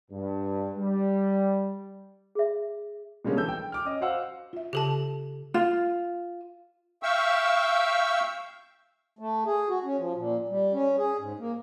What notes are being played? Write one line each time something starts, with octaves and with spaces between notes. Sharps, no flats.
G2
G3
G#4 E5
B2 D3 G3 G#3 A#3 C#4
E3 A4 E6 G6
G5
D6 F6
C#4 D#5
F#4 C5 F5 F#5 E6
F4 E5
C#3 G4 A4 A5
F4
E5 F5 G5 C#6 E6
A3
G#4
F#4
C#4
F3
A#2
G3
C#4
G#4
G#2
A#3